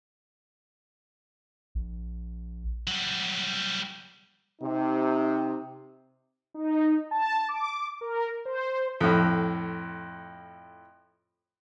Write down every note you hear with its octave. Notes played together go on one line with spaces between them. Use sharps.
A#1
F#3 G3
C3 D#4
D#4
A5
D6
A#4
C5
F2 A2